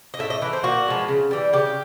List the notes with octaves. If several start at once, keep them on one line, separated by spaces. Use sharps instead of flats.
D#5
A2 E5
D#5
E3 A3 B4
C5
A#2 F#4
F3 G#3 B3
C#3
E3 G3
C#3 G4